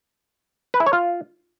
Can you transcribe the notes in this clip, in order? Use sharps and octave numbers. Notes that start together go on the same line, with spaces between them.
B4
E4
C#5
F4